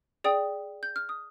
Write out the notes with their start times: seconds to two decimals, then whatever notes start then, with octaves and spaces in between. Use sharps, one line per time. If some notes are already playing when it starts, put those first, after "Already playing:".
0.24 G#4 D5 G5 D#6
0.83 G6
0.96 F6
1.09 D#6